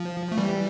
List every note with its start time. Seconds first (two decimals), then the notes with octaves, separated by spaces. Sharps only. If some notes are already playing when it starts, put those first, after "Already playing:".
Already playing: F3
0.32 A3
0.38 E3 G3